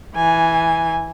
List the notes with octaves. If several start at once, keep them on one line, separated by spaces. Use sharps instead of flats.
E3 G#5